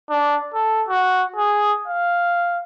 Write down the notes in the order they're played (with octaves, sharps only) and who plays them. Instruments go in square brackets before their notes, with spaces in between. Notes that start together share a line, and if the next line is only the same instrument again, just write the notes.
[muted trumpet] D4
A4
F#4
G#4
F5